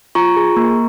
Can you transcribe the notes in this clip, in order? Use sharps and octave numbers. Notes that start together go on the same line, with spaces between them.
F4 A#5 C#6
G#4
A#3